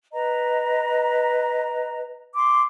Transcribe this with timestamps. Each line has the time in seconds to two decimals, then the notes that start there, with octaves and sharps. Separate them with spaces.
0.13 B4 D#5 A#5
2.35 C6 D6